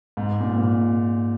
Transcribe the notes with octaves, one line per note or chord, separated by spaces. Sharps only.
G#2
A#2
G#2
A#2